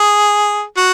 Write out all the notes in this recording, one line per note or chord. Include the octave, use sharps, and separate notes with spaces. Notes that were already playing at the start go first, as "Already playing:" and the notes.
Already playing: G#4
F#4